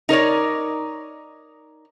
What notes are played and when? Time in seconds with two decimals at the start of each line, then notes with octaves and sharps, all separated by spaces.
0.09 D#4 A#4 C#5 D5